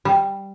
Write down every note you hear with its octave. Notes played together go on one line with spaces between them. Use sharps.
G3